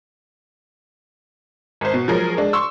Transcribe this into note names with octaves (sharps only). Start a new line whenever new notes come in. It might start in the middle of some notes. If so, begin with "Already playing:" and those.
G#1 C5
B2
F3 F#3 G#3 G#4 A#4
G#3 D4
C6 C#6 E6